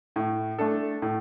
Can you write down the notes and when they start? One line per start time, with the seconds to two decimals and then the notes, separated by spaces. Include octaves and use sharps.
0.16 A2
0.59 A3 D4 A4
1.02 A2